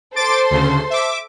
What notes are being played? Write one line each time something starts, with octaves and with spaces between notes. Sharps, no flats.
A4 C5 C6 D6 A6 D7
D2 C#3
E5 D6